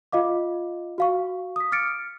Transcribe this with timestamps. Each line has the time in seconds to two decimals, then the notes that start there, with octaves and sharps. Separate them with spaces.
0.12 F4 D#5 F5 D6
0.98 F#4 F5 C#6
1.56 D#6 B6
1.72 D6 D#6 F6 A6 C#7 D7